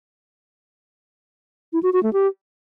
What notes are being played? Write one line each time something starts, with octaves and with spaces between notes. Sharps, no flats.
E4
F#4
F#4
A3
G4